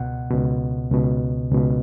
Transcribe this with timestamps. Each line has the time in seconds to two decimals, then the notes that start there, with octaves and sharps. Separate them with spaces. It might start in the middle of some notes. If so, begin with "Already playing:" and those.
Already playing: C#2 B2 F#5
0.31 C#2 B2
0.91 C#2 B2
1.51 C#2 B2